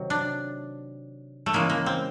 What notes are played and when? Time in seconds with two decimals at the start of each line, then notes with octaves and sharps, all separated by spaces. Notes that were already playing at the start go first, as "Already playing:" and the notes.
Already playing: C3 D#3 F#3
0.10 D4
1.46 A3
1.53 C#3 E3 G#3 A#3
1.70 A#3
1.86 C4